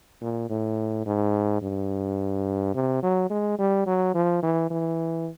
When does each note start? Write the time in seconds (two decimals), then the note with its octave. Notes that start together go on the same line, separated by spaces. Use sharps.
0.21 A#2
0.50 A2
1.06 G#2
1.62 G2
2.74 C3
3.03 F#3
3.30 G#3
3.58 G3
3.86 F#3
4.14 F3
4.43 E3
4.70 E3